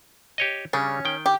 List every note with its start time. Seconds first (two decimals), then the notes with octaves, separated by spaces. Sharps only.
0.38 G4 C#5 D#5
0.73 C#3 G3 C#4 D4
1.05 D#3 G5
1.26 G4